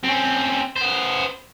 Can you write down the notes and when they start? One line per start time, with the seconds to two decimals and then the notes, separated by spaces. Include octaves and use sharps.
0.04 C4 C#4
0.76 B3 C5